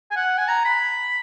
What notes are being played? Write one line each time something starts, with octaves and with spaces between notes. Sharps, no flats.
G#5
F#5
G#5
A#5
B5